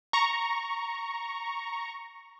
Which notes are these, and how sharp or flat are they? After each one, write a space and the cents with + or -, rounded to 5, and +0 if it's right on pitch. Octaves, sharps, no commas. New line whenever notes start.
A#5 +0 C#6 +0